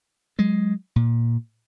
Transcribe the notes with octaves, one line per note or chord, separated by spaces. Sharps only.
F#3 G#3
A#2